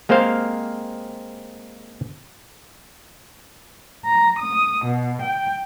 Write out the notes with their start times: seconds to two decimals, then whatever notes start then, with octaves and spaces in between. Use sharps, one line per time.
0.09 G#3 A#3 C4 G4 C5 F5
4.06 A#5
4.40 D#6
4.85 B2
5.22 G5